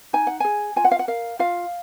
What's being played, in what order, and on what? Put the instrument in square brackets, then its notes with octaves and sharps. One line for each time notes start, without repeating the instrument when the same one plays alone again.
[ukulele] D#4 G#5
F#5
G#4 G#5
F4 G#5
F#5
F5
F#5
A#4 F5
F4 F5